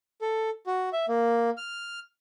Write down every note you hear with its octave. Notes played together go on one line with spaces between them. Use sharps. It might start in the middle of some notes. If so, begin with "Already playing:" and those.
A4
F#4
E5
A#3
F6